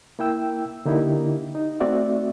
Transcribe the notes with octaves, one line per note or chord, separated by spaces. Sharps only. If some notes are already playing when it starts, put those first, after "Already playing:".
A#3 E4 G5 E6
D3 A#3 D#4 E4 G4
D#4
A3 C4 F#4 D5 E5